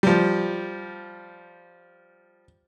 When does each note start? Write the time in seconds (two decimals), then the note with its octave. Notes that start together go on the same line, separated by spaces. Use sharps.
0.03 F3 G3